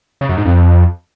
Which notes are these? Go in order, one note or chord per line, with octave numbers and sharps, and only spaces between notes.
C#3
F#2
G#2
F2